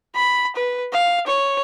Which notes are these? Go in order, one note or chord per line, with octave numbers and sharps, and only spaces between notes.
B5
B4
F5
C#5